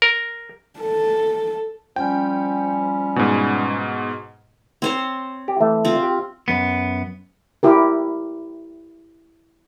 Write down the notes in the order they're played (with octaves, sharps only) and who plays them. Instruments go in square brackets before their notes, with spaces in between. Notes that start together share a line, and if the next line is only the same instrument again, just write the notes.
[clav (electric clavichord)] A#4
[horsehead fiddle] A4
[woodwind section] F3 G3 C#4 [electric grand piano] G5
[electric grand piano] G#2 B2
[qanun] C4 C5 C#5
[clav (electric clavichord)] G4
E3 A3 E5
[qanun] C4 F4
[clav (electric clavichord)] G4
[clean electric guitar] F#2 B3
[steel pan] E4 G4 A#4